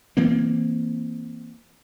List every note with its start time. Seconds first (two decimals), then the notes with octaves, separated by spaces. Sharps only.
0.17 E3 A#3 C4